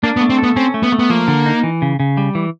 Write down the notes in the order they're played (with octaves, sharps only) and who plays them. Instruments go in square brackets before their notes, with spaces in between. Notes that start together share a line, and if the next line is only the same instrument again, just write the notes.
[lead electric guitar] A#3 [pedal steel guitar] D4
[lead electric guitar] B3
[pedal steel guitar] A3
[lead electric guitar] C4
[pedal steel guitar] A4
[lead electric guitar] B3
[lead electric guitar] C4 [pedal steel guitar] C#4
[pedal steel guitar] A3
[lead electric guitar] B3
[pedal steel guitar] A3
[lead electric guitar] B3
[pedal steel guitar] F3 [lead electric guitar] A#3
[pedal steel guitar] D3
D#4
E3
C#3
C#3
G3
E3